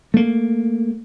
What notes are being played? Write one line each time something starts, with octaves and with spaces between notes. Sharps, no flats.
A3 A#3